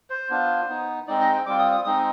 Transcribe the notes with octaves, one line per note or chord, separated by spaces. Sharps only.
C5
B3 D4 F4
B3 D#4
G#3 C4 D#4 D5
D#5
G5
G3 C4 F4 D6
D#6
D#6
G#3 C4 D#4 D#6